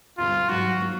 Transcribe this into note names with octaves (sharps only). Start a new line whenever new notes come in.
D2 C3 D#3 G3 F4
G#2 D#3 F#3 F#4
D#3 F#3 A#3